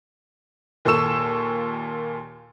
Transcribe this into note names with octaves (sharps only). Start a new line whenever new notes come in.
D#2 A#2 A4 C#6 E6 E7